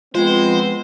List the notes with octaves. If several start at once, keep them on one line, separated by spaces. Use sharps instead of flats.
F3 G#3 B3 C4 B4 C5